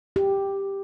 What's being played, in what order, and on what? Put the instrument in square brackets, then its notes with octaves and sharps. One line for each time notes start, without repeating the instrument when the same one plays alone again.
[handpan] G4